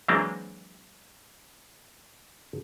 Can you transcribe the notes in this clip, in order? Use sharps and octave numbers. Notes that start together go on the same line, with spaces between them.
E3 F#3 G#3 A#3 C4 D4